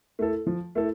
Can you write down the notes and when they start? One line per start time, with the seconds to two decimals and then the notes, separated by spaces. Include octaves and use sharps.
0.19 A3 E4 A4
0.47 F3
0.75 A3 E4 A4